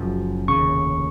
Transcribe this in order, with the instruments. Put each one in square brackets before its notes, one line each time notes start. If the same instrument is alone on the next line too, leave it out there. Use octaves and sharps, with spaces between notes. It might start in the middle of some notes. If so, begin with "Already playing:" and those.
Already playing: [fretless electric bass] F#1 F#2 F3
[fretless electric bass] F1 D#2 C#3 [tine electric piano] C#6